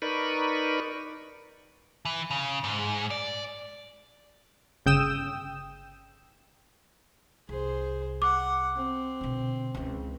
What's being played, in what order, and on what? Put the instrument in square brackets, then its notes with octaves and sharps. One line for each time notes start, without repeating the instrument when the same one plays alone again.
[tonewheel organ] D#4 A#4 B4 D5 B5 C#6
[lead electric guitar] E3
C#3
G#2
D5
[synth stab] G1 C#3 G5 D#6 E6 E7
[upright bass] C2 [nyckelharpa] G#4 C5
[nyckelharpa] F#5 [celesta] D6
[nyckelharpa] C4
[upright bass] B2 D3
C#2 E3